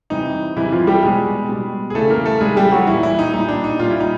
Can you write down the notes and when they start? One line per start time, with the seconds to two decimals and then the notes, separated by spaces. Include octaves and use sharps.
0.10 C3 E3 G3 D#4
0.56 C3 E3 G3 E4
0.72 F3 F4
0.87 G3 G4
1.03 B2 G3 G#3 G#4
1.49 B2 G3
1.90 G#4
1.95 C#3 E3 G3 A3 A4
2.10 A#3 A#4
2.25 A3 A4
2.41 C#3 E3 G3 G#3 G#4
2.56 G3 G4
2.72 F#3 F#4
2.87 A#2 E3 G3 E4
3.03 E3 E4
3.19 D#4
3.33 A#2 G3 D#4
3.48 D4
3.64 D#4
3.79 A#2 G3 F4
3.90 E4
4.00 D#4